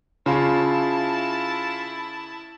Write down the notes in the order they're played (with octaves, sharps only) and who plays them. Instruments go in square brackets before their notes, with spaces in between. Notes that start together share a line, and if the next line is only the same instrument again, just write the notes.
[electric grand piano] C#3 [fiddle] E4 A5 [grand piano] F4 C#5